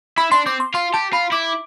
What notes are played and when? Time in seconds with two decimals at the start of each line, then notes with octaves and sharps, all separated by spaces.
0.17 E4 B5
0.32 D4 C6
0.46 C4 D6
0.60 C6
0.74 F4 C6
0.93 G4 A5
1.13 F4 B5
1.32 E4 D6